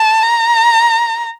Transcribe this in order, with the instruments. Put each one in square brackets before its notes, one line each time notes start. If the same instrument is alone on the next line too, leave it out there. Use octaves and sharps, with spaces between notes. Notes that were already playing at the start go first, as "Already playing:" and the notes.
Already playing: [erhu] A5
A#5